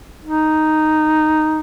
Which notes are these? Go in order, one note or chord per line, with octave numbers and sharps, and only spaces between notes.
D#4